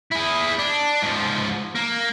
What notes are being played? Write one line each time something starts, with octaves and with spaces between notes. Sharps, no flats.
E4 G#4
D4
G#2 F3
A#3